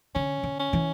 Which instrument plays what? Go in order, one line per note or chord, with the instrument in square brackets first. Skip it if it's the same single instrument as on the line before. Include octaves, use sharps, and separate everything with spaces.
[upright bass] D3 [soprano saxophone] C#4
[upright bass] D3
[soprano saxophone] C#4
[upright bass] E3